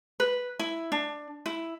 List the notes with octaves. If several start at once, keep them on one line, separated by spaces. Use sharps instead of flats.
B4
E4
D4
E4